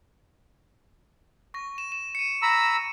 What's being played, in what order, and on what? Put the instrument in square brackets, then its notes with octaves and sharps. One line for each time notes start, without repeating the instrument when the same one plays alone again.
[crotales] C#6 A#6
E7
E7
C#7 D#7
[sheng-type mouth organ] A#5 B5 E6